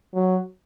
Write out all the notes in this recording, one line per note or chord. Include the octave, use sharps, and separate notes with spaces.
F#3